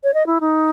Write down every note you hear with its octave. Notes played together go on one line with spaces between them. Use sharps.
C#5
D#5
E4
D#4